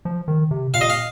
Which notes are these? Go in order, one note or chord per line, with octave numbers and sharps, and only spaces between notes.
F3
D#3
C3
A#2 F5
D#5
F5